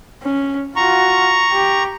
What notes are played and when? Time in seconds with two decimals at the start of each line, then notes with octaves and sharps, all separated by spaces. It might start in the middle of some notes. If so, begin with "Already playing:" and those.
0.23 C#4
0.76 F4 F#4 A#5 C#6
1.53 G4